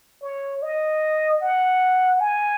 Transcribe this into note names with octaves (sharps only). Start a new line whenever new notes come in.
C#5
D#5
F#5
G#5